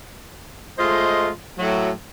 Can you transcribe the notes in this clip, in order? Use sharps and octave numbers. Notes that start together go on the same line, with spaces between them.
G#3 A3 F4 C5 D#5
A2 F#3